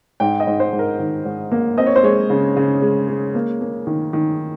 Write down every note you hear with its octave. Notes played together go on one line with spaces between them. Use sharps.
G#2 G5
D#5
G#2
C5
G#2
A#4
D#3
G#2
A#3
C4 D#5
C#5
C5
G#3 C#5
C#3
C#3
G#3
G#3
A#3
A#3
D#3
D#3